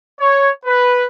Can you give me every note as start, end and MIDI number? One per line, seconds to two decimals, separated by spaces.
0.20 0.50 73
0.66 1.06 71